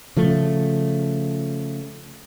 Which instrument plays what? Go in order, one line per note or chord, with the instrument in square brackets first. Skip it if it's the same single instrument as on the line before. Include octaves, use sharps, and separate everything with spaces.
[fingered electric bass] C#3 F3 A3